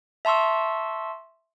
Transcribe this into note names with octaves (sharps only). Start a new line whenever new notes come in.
E5 A5 C6 C#6 E6